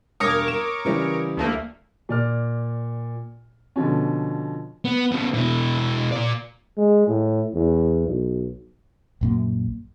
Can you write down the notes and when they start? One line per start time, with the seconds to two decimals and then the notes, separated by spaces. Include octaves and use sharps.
0.20 E1 G2 A#4 C#5 D6 D#6
0.48 E7
0.85 C#3 E3 G3
1.37 D2 A3 A#3
2.09 A#2 D5 F6
3.76 B2 D3 F3 C#4
4.85 B3
5.12 C#3 B3
5.34 B2 E4
6.12 A#2 D5
6.77 G#3
7.08 A2
7.55 E2
8.07 B1
9.21 A#1 F#2 A#3